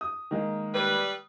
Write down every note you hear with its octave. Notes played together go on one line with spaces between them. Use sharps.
D#6
D#3 G#3 A#3
G3 B4